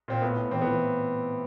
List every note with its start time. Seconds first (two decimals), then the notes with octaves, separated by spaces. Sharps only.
0.08 A#2 C4
0.22 A2 B3
0.36 A2
0.51 E3 C4
0.62 B3
0.67 E3